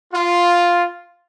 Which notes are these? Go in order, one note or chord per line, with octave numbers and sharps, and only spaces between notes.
F4